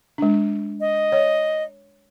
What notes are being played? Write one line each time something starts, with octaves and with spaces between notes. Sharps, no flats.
G#3 D4
D#5
C#5